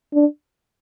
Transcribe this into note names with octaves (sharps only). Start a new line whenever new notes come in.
D4